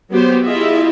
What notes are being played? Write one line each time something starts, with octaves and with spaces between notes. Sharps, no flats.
F#3 B3 G4 C5
E4 F4 G4 G#4 D#5 E5